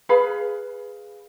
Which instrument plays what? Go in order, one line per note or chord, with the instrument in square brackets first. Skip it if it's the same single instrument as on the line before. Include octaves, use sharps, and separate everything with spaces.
[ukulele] G#4 B4 F5 B5